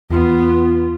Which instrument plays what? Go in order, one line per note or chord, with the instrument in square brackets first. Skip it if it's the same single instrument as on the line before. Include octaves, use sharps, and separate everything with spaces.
[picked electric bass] E2 [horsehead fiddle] B3 [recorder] F4